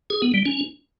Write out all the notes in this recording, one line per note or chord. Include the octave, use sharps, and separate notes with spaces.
G#4
B3
G3
C#4